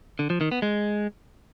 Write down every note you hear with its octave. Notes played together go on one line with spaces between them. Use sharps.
D3
F3
D#3
B3
G#3